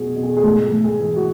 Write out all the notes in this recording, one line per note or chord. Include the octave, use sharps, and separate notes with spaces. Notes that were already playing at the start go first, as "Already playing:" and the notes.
Already playing: B2 F#3 F#4 G#4
B2
G#4
G#4
G#2 A4
G#2
G#4
E3
F#4